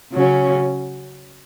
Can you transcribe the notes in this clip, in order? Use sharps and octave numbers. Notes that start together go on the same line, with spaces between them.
C#3 F#3 C#4